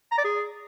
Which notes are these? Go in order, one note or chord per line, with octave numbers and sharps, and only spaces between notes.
A#5
D5
G#4